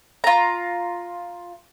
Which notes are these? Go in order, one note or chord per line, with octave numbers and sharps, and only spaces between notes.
F4 A#5